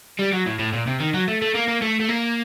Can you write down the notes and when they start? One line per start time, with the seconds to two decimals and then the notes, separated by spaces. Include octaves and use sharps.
0.19 G3
0.33 F#3
0.46 A2
0.59 A2
0.73 A#2
0.87 C3
1.00 D#3
1.14 F#3
1.28 A3
1.42 A3
1.55 A#3
1.68 A#3
1.82 A3
2.00 A3
2.09 A#3